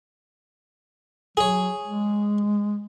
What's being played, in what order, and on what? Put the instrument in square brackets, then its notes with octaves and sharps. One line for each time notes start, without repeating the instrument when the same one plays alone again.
[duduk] F#3 [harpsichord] G#4 C#5
[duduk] G#3